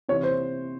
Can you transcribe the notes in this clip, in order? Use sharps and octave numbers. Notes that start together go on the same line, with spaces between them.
C3 E3 C#5
C5